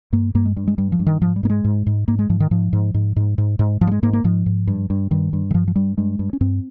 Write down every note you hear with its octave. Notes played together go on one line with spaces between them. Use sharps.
G2 A#3
G2 A#3
G#3
G2 G3
G#3
G2 G3
F3
G2
D#3
G#2 F3
G3
G#2 A#3
G#3
G#2
G#2
G#2 A#3
G#3
G#2 F3
D#3
G#2 F3
G#2
G#2
G#2
G#2
G#2
G#2 F3
G3
G#3
G#2 A#3
A#3
G#2 F3
G#2
G2
G2
G2 D#3
G2
D#3
G2 F3
F3
G2 G3
G2 G#3
G2
C#4
G2 C4